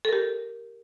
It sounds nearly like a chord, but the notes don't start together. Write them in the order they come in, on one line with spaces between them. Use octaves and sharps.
A4 A#4 G4